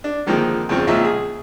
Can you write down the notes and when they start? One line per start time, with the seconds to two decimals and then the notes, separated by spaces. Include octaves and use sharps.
0.04 D4
0.27 D3 D#3 F3 G#3 A#3 C4
0.69 E2 C#3 F3 C4
0.87 C#2 A#2 F3 D#5 E5
1.05 G#4